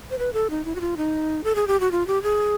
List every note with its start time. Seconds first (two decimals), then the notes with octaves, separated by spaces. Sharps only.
0.10 C5
0.19 B4
0.33 A4
0.50 D#4
0.65 E4
0.75 F#4
0.81 F4
0.97 D#4
1.44 A4
1.55 G#4
1.67 G4
1.80 F#4
1.92 F4
2.07 G4
2.23 G#4